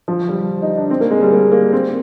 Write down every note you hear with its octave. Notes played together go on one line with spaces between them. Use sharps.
F3
G3
D#4
D4
C4
A#3
G#3
G3
A#3
A#3
C4